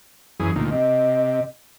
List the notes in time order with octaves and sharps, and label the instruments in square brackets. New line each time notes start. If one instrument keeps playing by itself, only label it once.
[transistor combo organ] F#2 E3 G#4
D2 A#2 D#3
[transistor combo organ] C3 [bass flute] D#5